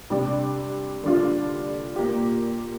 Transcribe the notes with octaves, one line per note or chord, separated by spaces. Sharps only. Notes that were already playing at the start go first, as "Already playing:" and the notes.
C3 G3 D4
D3 G3 D4 F4
A#2 A#3 G4